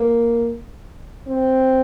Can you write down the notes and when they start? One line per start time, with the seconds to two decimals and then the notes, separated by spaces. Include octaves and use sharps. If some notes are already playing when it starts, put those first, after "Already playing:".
Already playing: A#3
1.27 C4